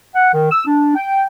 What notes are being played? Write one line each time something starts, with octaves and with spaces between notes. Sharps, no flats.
F#5
D#3
E6
D4
G5